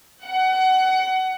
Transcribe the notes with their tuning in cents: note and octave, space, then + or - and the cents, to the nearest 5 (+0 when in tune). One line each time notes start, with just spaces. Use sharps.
F#5 +25